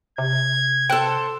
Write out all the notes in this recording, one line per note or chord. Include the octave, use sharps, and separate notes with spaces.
C3 G#6
A4 C5 G5 F#6